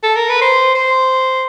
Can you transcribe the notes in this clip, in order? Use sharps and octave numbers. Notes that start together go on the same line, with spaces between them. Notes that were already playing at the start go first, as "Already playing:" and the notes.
A4
A#4
B4
C5
C5